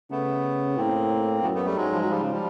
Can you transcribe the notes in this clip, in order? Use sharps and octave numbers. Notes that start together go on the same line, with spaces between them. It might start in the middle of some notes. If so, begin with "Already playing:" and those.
C#3 A3 B3
A2 A#3 C4
F#2 A3 B3
A3 B3
G3 A3
G#2 F#3 G#3
F3
F#3
F3 G3
C#3
F3 G3